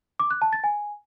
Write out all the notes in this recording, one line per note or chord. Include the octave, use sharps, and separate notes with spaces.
D6
F#6
A5
A6
G#5